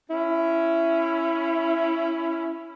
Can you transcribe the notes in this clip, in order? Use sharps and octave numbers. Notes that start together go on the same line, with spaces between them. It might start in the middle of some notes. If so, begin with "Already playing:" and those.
C#4 E4